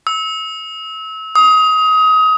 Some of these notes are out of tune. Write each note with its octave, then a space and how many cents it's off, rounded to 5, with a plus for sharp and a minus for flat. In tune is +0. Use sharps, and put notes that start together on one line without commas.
E6 -30
D#6 +25